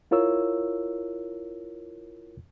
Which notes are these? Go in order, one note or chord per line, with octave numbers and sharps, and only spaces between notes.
E4 F4 A#4 C#5 E6